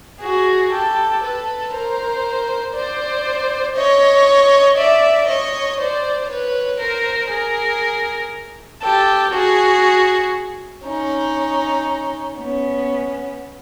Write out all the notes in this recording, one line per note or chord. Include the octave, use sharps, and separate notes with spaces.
F#4 G#4
G4 A4
A4 B4
A#4 C5
C5 D5
C#5 D#5
D5 E5
C#5 D#5
C5 D5
B4 C#5
A#4 C5
G#4 A#4
G4 A4
F#4 G#4
C#4 D#4
B3 C#4